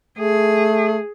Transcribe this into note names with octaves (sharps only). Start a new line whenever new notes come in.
A3 G#4